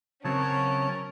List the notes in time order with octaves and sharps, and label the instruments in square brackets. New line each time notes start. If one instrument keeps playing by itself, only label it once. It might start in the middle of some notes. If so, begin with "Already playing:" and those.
[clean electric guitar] C#3 F#3 C4 [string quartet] C#4 A#4 [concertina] C#5 A5